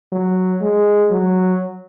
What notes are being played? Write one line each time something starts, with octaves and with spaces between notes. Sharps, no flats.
F#3
G#3
F#3